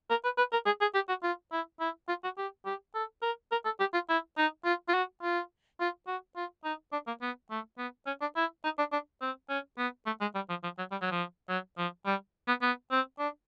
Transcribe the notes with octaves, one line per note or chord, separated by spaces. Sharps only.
A#4
B4
B4
A#4
G#4
G#4
G4
F#4
F4
E4
E4
F4
F#4
G4
G4
A4
A#4
A#4
A4
G4
F4
E4
D#4
F4
F4
F#4
F4
F4
F#4
F4
D#4
D4
A#3
B3
A3
B3
C#4
D4
E4
D#4
D4
D4
C4
C#4
B3
A3
G#3
G3
F3
F3
F#3
G3
F#3
F3
F#3
F3
G3
B3
B3
C4
D4